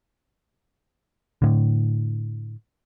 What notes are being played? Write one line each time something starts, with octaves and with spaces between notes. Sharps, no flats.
A2 D3